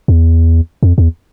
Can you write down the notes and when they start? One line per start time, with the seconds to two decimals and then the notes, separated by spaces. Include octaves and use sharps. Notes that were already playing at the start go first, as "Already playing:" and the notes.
0.08 E2
0.83 F2
0.98 E2